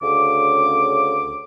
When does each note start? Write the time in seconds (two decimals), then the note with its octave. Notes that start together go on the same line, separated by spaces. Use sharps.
0.02 D2 C#3 D6